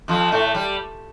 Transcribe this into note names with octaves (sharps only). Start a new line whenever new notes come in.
F2 F3
A2 A3
G3